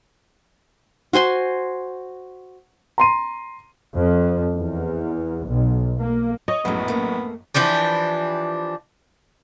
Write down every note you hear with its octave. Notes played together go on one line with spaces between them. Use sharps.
F#4 C5 G#5 C6
A#5 C6 D#7
F2
E2
B1
A#3
C#5 D#5
A#1 F#2 A2 F#3 G#3 A3 B3
A3 A#3
E3 F3 D4 G4